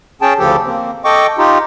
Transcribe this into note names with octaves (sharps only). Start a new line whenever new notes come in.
C#4 G#4 G5 A5
D2 C#3 F3 G4 A4
A#3 C4
A4 D#5 G5 C#6 D6
D#4 F4 G4